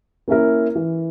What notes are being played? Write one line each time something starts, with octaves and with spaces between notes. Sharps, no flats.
A#3 C#4 E4 A#4
E3